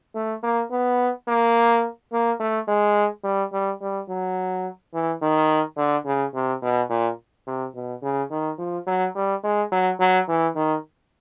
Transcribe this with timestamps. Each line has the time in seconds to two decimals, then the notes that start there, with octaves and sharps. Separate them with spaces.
0.15 A3
0.43 A#3
0.71 B3
1.28 A#3
2.13 A#3
2.40 A3
2.68 G#3
3.24 G3
3.53 G3
3.81 G3
4.09 F#3
4.94 E3
5.22 D#3
5.77 D3
6.05 C#3
6.34 C3
6.62 B2
6.90 A#2
7.47 C3
7.75 B2
8.03 C#3
8.31 D#3
8.59 F3
8.87 F#3
9.15 G3
9.44 G#3
9.72 F#3
10.00 F#3
10.28 E3
10.55 D#3